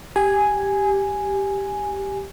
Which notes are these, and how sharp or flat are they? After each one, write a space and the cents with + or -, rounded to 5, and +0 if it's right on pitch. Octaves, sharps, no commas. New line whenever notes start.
G4 +0 G#5 +0